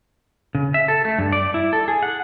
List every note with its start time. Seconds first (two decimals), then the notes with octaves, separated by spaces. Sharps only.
0.55 C#3
0.74 E5
0.88 A4
1.05 A3
1.19 G2
1.32 D5
1.54 E4
1.73 A4
1.88 G#4
2.03 F#5